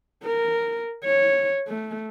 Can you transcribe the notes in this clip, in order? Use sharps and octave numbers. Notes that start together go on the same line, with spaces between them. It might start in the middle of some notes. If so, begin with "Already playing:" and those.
A#4
C#5
A3